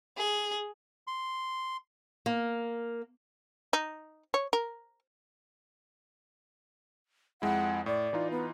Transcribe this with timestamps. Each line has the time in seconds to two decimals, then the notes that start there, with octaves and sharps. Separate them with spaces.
0.17 G#4
1.07 C6
2.26 A#3
3.73 D#4
4.34 C#5
4.53 A#4
7.42 F2 G#3 E4 F#5
7.86 A2 D5
8.13 E3 D#4 F4
8.31 B3